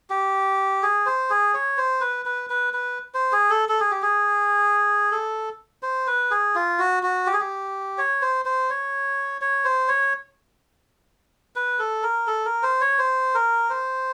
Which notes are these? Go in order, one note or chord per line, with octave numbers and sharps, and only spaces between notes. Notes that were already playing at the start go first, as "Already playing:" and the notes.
G4
G#4
C5
G#4
C#5
C5
B4
B4
B4
B4
C5
G#4
A4
A4
G#4
G4
G#4
A4
C5
B4
G#4
F4
F#4
F#4
G4
G#4
G4
C#5
C5
C5
C#5
C#5
C5
C#5
B4
A4
A#4
A4
A#4
C5
C#5
C5
A#4
C5